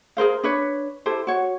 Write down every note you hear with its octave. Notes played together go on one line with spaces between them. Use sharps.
G#4 A#4 C5 F5
D4 B4 C#5
E4 G4 A4 C5
F#4 C#5